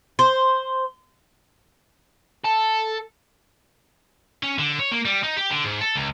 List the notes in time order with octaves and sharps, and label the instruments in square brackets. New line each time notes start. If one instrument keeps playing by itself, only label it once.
[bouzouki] C5
[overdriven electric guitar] A4
[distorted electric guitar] C#4
D3
C#5
A#3
G3
D#4
G4
D3
G#2
A4
C#2